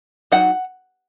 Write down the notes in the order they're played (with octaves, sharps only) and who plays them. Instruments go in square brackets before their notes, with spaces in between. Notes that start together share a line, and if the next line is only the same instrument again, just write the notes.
[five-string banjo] F#3 D#4 F#5